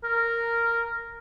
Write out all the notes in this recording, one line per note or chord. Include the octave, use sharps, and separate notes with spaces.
A#4